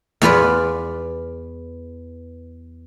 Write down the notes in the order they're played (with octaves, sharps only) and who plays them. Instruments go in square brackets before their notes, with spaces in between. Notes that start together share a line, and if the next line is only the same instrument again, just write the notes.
[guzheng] E2 B3 F4 B4 D5